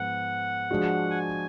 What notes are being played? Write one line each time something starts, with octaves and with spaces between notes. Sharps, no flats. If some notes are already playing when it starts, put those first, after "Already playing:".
Already playing: G#2 F3 B3 F#5
F3 G#3 D4 F#4
G#5